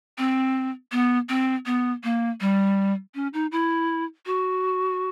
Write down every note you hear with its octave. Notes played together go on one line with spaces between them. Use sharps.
C4
B3
C4
B3
A#3
G3
C#4
D#4
E4
F#4